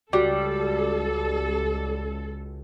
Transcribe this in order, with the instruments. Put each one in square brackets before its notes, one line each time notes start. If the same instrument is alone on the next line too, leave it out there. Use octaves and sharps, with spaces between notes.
[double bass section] C#2 [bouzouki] G3 [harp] F#4 [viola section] A4